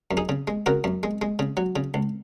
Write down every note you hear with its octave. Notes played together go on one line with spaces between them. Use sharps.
F#2
D#4 G#4
C#3
G#3
C#3 F#4 A#4
F#2
G#3
G#3
C#3
F#3
C#3
C#2